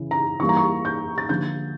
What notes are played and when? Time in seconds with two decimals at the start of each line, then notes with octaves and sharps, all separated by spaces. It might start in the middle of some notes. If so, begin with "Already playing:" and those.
Already playing: C#3 E3
0.11 A#5
0.40 E3 G3 A#3 C#6
0.49 A#5
0.57 C#6
0.85 G6
1.18 A6
1.29 D3 F3 A#3 G6